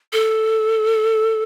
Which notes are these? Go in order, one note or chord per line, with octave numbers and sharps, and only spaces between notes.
A4